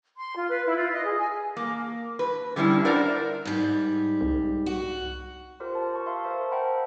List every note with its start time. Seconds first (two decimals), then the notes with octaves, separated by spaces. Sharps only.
0.17 C6
0.36 F4
0.49 B4
0.65 E4
0.77 F4
0.92 D#5
1.05 G#4
1.17 G#5
1.57 A#3
2.19 B4
2.56 D3 G3 C#4 D#4 E4
2.85 A#4 C5 D5 E5 F#5 A#5
3.45 G#2 G3
4.21 C2
4.66 F#4
5.60 F4 G4 A#4 C5
5.75 A5
5.93 A5 C#6
6.06 E5 F5 C6
6.24 A#4 C5 E5 A5
6.51 C5 E5 F#5 G5 A#5 B5